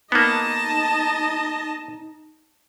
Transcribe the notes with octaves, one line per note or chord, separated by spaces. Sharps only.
A#3 B3 D#4 D#5 A5